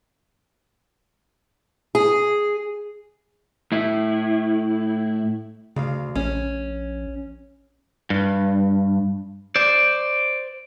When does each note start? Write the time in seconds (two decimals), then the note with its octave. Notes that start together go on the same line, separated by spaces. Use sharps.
1.95 G#4
3.72 A2 E4
5.76 D2 C#3 F5
6.15 A#1 C#4
8.10 G2
9.56 C5 D5